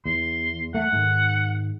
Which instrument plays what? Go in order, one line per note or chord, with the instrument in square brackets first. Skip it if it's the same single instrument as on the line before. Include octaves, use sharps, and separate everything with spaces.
[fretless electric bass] E2 [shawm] C6
[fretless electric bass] A3 [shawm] F#5
[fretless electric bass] G#2 D#3